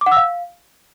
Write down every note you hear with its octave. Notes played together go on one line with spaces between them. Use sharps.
D6
F#5
E6
F5